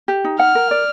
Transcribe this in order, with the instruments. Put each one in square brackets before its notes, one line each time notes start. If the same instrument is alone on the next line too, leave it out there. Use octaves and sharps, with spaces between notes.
[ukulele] G4
D#4
[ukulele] F#5 [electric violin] F6
[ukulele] A#4
D5